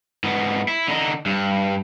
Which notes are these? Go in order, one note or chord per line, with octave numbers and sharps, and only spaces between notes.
G#2 B3
E4
D3 D#4
G2